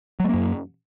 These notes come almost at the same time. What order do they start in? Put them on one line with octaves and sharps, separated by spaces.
F#3 A3 A#3 F#2